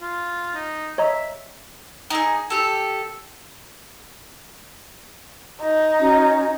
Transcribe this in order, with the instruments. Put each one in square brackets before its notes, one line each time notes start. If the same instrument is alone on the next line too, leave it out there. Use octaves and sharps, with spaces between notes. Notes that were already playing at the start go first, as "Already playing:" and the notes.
[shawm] F4
D#4
[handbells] C#5 D#5 A#5 [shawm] E5
[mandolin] D#4 G#4
G4 A4
[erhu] D#4
[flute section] C#4 F#4 A#5